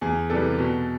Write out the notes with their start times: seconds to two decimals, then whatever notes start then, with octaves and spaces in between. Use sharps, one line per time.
0.01 E2 G#4
0.30 C3 E3 G3 A4
0.58 B2